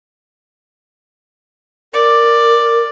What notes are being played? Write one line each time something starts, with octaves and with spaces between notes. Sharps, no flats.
A#4 D5